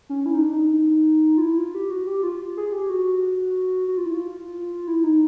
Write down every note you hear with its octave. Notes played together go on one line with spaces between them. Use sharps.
C#4
E4
D#4
D4
D#4
F4
E4
F4
G4
F#4
G4
F4
G#4
G4
F#4
F#4
F4
E4
F4
E4
D#4